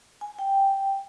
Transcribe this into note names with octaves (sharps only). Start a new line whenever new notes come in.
G#5
G5